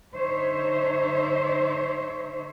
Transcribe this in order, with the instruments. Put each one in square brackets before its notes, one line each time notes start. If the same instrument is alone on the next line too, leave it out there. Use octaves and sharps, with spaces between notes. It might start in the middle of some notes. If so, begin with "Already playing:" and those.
[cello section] D3 D#4 C5 C#5 E5